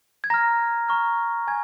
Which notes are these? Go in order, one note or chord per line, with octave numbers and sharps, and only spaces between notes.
G#6
A#5 F6 A#6
A#5 C#6 F6
G#5 G#6